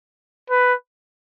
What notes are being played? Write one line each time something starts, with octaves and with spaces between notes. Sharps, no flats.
B4